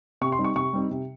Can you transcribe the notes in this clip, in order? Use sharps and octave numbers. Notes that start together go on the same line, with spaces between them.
C3 C#6
C6
G3 C4 D#4
C#6
C3 C#6
G3 C4 D#4
C3